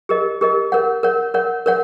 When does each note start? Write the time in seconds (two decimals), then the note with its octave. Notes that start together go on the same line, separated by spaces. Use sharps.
0.09 G4 A#4 D#5
0.41 G4 A#4 D#5
0.72 A#4 C#5 F#5
1.03 A#4 C#5 F#5
1.34 A#4 C#5 F#5
1.66 A#4 C#5 F#5